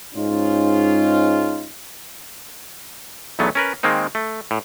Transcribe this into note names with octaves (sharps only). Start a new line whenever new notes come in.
G#2 C#4 D#4 F4
B1 E2 F#3 A3 B3
C#4 A#4 B4
D#3 G#3 A#3 C4 D#4
A3
A2